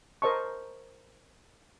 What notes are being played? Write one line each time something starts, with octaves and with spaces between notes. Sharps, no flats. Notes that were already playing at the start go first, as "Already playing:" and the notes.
A#4 C5 D#5 A5 C#6